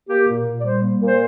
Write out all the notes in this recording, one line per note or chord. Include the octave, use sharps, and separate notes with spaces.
A#3 G4
A#2
A#2
D5
G3 C5
A#3
A#2
C5